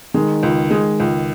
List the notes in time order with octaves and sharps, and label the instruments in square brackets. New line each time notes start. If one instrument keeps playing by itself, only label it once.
[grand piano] D#3 [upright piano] G#3
[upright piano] C#2
G#3
C#2